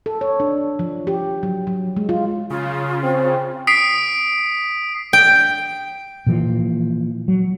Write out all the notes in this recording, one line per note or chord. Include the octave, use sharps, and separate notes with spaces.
A4
C#5
D4
F3
G4
F#3
F#3
G#3
F4
C#3 F4
C4
D#6 B6 C7 D7
G5
A#2 E3 F3
F#3